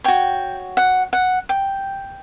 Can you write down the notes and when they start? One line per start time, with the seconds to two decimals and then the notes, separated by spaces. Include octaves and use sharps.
0.04 F#4 C#5 G5
0.77 F#5
1.13 F#5
1.49 G5